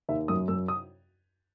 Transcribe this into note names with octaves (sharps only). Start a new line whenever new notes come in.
D#2 E5
F#2 D#6
F#2 E6
D#6